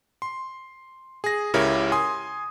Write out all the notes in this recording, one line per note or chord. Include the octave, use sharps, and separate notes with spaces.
C6
G#4 A#6
C#2 C#3 E4 G4 A#4 C#5
G#5 C6 D#6